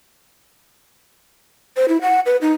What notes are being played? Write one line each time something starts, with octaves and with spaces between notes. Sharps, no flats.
C5
E4
F#5
B4
D#4